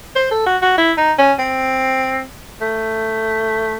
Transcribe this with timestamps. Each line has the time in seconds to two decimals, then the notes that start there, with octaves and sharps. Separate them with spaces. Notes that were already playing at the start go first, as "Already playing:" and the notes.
0.16 C5
0.31 A4
0.46 F#4
0.62 F#4
0.78 E4
0.98 D#4
1.18 C#4
1.39 C4
2.61 A3